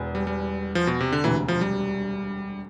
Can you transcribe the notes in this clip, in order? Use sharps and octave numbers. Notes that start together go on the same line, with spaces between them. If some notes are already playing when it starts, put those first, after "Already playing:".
Already playing: E1 E2
G3
G3
F3
B2
C3
D3
E1 D2 C3 E3
F3
G3